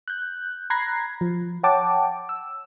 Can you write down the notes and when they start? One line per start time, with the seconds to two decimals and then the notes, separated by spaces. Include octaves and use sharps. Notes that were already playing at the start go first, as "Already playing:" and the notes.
0.08 F#6 G6
0.70 A#5 B5 F#6 G#6 A#6 C7
1.21 F3
1.63 C#5 F#5 G5 A5 D6
2.29 E6